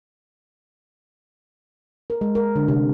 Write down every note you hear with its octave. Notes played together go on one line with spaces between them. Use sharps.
A#4
G#3
A#4
D3
C3